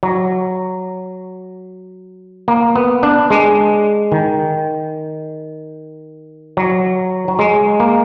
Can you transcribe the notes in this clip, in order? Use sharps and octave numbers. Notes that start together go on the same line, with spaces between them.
F#3
A#3
B3
D4
G#3
D#3
F#3
F#3
G#3
A#3